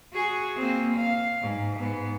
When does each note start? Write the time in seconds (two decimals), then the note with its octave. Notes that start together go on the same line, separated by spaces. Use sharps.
0.13 F#4 G#4
0.57 A#3 C4
0.97 F5
1.42 G#2
1.79 G#2 B3